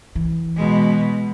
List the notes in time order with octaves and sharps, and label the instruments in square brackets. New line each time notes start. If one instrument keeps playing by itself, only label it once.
[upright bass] E3
[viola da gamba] B2 G#3